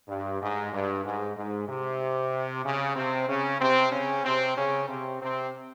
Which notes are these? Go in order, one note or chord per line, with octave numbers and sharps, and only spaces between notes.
G2
G#2
G2
G#2
G#2
C3
C#3
C3 C4
C#3 C#4
C3 C4
C#3 C#4
C3 C4
C#3 C#4
C3 C4
C3 C4